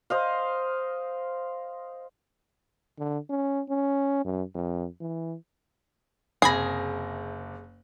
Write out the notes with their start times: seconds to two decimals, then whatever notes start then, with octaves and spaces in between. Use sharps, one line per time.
0.10 C5 D#5 F5
2.99 D3
3.30 C#4
3.69 C#4
4.25 F#2
4.55 F2
5.01 E3
6.42 F#1 C3 G#4 B5 G#6 A#6 C7